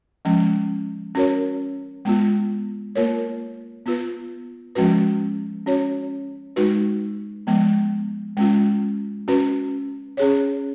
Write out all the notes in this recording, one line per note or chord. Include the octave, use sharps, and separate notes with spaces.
F3 G#3 C#4
C#4 F#4 A#4 C#5
G#3 B3 F4
A#3 F4 A#4 C#5
B3 F4 B4
F3 G#3 C#4 F#4 B4
C#4 F#4 C#5
G#3 D#4 F#4 B4
F3 G#3 B3
G#3 C#4 F4
C#4 F#4 B4
C#4 G#4 C#5